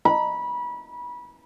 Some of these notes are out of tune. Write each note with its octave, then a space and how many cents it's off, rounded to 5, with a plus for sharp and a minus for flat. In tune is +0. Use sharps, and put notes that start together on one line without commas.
B5 -25